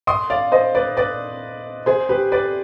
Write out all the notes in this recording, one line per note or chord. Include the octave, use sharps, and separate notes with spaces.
C6 D#6
D5 F5
C5 D#5
B4 D5
B4 D5
G#4 C5
G4 B4
B4 D5